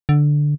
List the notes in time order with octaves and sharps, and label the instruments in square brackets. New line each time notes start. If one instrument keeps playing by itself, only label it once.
[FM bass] D3